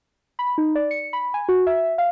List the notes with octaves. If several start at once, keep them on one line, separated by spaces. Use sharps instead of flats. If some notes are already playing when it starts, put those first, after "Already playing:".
B5
D#4
D5
C#7
B5
G#5
F#4
E5
F5